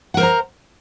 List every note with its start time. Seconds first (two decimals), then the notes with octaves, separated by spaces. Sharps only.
0.14 F#5
0.17 A#4
0.20 C5
0.23 A#5